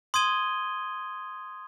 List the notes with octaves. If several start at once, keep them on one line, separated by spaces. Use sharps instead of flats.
C6 D#6 G#6 D#7 G7